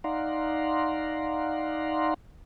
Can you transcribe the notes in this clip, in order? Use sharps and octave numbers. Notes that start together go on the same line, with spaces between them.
D#4 D5 F5 F#5 A#5 C6